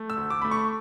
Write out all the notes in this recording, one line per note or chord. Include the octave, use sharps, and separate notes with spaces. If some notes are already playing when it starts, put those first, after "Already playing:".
Already playing: A3
E6
D2
D6
A3 B5
C#6